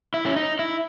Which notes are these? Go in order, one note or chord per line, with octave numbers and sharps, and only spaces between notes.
E4
C#4
D#4
E4